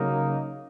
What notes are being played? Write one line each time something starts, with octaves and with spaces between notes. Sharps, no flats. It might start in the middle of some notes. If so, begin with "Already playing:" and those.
Already playing: C#3 F#3 A#3 D#4